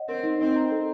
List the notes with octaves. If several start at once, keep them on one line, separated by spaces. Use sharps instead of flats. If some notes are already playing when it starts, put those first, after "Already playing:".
Already playing: C#5 D#5 F#5
C4 A#4
D#4
C4 D#5
A#5
A4